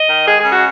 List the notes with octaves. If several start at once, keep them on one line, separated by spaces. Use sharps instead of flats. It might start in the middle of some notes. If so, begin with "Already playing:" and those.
Already playing: D#5
D#3
G#3 G#4
G#4
C#3
F#4